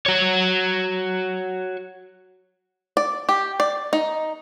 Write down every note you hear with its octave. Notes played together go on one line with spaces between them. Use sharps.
F#4 C#5
D5
G4
D5
D#4